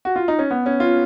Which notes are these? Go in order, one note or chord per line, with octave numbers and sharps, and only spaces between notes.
F#4
F4
D#4
C#4
B3
C#4
F4